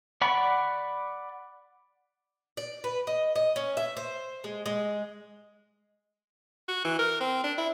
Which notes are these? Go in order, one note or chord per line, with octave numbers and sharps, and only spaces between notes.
D5 F#5 B5 C#6
D5
B4
D#5
D#5
C#4
E5
C5
G#3
G#3
F#4
E3
A#4
C4
D4
E4